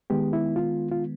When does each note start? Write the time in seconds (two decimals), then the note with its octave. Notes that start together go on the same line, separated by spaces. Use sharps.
0.10 D#3 G#3 B3 G4
0.33 E4
0.56 F4
0.91 F4